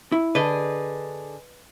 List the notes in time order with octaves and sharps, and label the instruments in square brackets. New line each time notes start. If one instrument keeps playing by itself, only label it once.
[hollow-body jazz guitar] E4
[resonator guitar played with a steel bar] D3 G#4 [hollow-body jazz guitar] B4 D#5